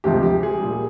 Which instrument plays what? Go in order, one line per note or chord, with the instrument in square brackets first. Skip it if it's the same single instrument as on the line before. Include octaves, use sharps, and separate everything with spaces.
[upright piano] D2 C3 F3 G#3 G4
G4
G#4
A#2 G3